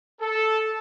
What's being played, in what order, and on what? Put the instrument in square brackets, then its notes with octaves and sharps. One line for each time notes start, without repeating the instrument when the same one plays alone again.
[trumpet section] A4